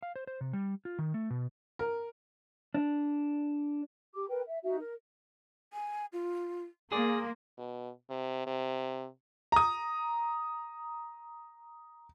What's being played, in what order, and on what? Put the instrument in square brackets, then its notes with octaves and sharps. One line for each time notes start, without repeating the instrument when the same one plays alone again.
[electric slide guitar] F5
C5
C5
C3
G3
F4
D#3
A3
B2
[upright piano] A#4
[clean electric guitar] D4
[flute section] G4 D6
A#4 B4 G5
E5
D#4 F#4 E5
A#4
[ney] G#5
F4
[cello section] A#3 [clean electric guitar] G#4 D5 [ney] C6
[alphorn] B2
C3
C3
[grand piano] A#5 D#6